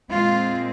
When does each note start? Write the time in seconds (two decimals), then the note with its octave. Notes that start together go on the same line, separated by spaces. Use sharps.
0.12 A#2 G#3 C4 F4